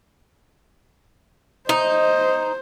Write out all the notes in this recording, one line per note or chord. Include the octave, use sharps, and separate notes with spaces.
D#4 C5 D#5